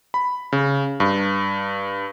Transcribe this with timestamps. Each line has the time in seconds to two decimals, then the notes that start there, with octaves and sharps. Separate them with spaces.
0.14 B5
0.52 C#3
1.00 G2